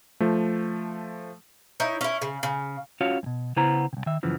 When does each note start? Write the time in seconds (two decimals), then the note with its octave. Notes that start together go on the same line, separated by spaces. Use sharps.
0.20 F3 A3
1.80 D#4 E4 C#5
2.01 C#4 E4
2.22 C#3
2.43 C#3
3.01 C#4 F4 F#4 C#5 F5
3.23 F#2 B2
3.56 C#3 B3 E4 C5 A#5
3.93 C2 C3
4.06 D#3 E5
4.23 F#2 C#3 E3 F3